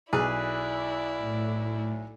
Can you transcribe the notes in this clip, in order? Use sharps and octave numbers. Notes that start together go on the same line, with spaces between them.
B1 E4 G#4 B4 D5
A2